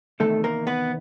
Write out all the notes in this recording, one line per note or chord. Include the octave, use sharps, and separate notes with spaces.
E2 C3 D#3 A3 A4
A#3 A#4
B3 B4